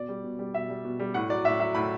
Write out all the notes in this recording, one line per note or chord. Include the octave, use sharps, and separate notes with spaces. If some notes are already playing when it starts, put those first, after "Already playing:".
Already playing: B2 D5
G3
B2
G3
B2 E5
G3
B2
G3
A2 F#5
F#3 D5
A2 E5
F#3 E5
A2 B5